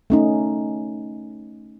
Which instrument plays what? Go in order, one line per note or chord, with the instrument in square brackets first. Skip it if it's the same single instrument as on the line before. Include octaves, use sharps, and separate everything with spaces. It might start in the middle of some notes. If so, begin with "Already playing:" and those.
[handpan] A3 C#4 D#4